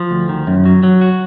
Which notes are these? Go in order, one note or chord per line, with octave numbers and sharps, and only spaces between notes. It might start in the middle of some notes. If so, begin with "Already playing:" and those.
Already playing: F3
D2
D#3
F#2
F#3
F#3
F#4